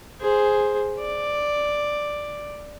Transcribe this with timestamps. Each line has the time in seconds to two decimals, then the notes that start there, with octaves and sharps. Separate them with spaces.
0.20 G#4 C5
0.99 D5